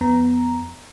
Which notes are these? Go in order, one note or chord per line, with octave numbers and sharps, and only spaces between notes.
F2 B3 A#5